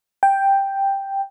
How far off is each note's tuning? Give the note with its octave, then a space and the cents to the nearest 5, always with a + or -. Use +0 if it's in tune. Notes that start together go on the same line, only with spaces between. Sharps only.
G5 +5